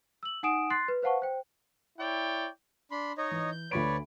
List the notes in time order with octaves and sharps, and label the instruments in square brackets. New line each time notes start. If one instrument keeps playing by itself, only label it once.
[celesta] E6 F#7
D#4 F#5 G#5 D#6 D7 E7
C6 F#6 A6 C7
B4
B4 C5 F5 F#5 A5 C#6
C5 G5
[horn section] E4 C#5 D5 G5
[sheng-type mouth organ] D4 B5 C6
D#4 C#5 D#5
[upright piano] E3
[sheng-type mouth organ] G6
[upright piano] D2 B5 D7 [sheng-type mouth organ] B4 C#5 D5